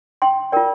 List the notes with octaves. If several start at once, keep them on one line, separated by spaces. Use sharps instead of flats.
G5 C6
F4 A#4 D5 G5